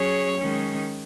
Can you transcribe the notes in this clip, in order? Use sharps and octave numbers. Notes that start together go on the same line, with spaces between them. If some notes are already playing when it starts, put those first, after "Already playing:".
Already playing: F#3 C#4 G#4 C#5
D#3 G#3 C#4